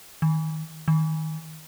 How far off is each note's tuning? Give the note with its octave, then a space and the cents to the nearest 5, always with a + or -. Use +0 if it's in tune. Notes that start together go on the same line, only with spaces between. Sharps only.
D#3 +15
D#3 +15